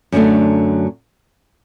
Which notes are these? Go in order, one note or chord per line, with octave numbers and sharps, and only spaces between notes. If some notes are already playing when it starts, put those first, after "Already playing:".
F#2 D3 F#3 A3 D4